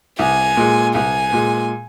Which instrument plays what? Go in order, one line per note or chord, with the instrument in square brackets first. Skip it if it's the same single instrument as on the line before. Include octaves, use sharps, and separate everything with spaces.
[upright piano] C2 [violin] G#5
[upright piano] A#2 G#3
[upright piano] C2 [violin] G#5
[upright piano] A#2 G#3